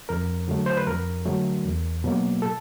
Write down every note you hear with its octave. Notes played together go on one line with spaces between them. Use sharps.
F2 A#4
D3 F#3 A3
C5
B4
F2 A#4
D3 F#3 A3
E2
B2 F#3 A#3
A4